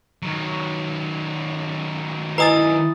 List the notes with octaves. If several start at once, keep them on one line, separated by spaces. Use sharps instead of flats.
D#3 F#3
E4 B4 D#5 G#5 A#5 D#6 A6